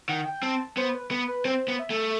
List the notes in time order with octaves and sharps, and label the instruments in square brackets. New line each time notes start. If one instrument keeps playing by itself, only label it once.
[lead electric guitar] D#3 [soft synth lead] F#5
[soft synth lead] G5
[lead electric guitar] C4 [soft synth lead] A5
[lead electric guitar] B3 [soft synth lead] C5
[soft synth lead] B4
[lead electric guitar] B3 [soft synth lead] B4
[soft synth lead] B4
[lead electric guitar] C4 [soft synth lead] C5
[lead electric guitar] B3
[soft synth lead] E5
[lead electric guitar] A3